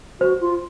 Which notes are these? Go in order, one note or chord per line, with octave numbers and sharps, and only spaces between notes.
F#4 C5
F4